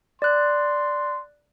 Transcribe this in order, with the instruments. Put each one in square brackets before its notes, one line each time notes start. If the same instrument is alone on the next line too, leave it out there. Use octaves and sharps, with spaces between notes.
[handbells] D5 F#6 [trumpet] C6